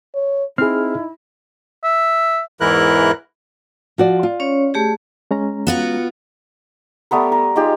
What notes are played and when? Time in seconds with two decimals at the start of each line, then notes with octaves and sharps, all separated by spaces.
0.15 C#5
0.58 C4 D#4 E4 G#4 F6
1.84 E5
2.61 E2 G#2 E3 E4 A#4 F#6
3.98 F3 F#4 D5
4.23 F4
4.40 C#4 C#5
4.74 A3 G4 G#4
5.31 G#3 C#4 A#5
5.67 B3 F4 F#4
7.11 G3 A3 B3 A#4
7.32 A#4
7.56 G#3 D#4 F4 G4